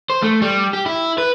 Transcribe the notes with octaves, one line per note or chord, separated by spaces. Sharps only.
C5
A3
G3
G4
E4
B4